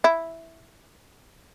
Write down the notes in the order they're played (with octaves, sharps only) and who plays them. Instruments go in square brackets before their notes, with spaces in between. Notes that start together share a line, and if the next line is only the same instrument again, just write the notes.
[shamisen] E4